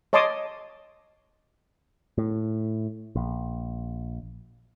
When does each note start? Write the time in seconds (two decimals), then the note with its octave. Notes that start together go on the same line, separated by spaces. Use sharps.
0.13 C#5 D#5 A5 C6 D6 D#6
2.18 A2
3.16 A#1